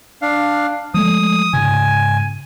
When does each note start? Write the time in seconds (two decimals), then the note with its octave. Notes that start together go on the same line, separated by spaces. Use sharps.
0.22 D4 F5
0.94 F3 G#3 A3 D#6
1.53 G#2 C#3 G#5